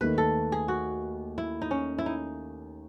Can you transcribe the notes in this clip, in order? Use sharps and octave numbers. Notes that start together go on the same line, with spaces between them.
D#2 D#3 A3 B4
A4
G#4
F#4
E4
D#4
C#4
E4
D#4